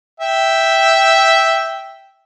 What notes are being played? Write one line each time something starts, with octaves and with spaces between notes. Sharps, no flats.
E5 G5